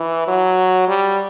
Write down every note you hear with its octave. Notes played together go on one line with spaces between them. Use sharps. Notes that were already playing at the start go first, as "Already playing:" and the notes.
Already playing: E3
F#3
G3